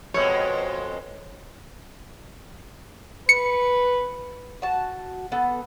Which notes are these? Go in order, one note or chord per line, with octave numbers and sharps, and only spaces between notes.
F2 B2 G#3 C#5
B4 C#7
F#4 A5
B3 A4